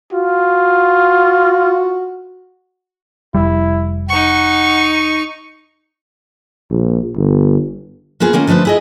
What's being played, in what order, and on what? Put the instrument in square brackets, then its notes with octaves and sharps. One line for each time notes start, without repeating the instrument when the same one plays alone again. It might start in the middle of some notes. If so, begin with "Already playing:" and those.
[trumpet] F4 [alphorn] F#4
[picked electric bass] F1 G3 [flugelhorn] E4
[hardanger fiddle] D#4 C#6 [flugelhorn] F#5
[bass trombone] A#1
G1
[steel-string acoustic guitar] A#3 B3 F4 G#4
D#3 A#3 C#4 F4
D3 F3 A3 B4 C5
E4 G#4 D#5